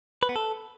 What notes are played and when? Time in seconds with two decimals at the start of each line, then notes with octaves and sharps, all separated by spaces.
0.23 B4
0.29 B3
0.36 A4